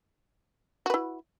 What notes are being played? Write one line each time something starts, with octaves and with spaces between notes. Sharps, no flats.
E4 F#4 B4